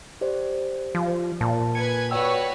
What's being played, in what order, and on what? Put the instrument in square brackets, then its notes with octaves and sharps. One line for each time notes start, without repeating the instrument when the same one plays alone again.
[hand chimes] G4 C5 D5
[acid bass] F3
[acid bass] A#2 [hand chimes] A5
[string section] B4 G#5 G#6 [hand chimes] C#7
[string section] F#4 B4 C#5 [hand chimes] D5 G5 E6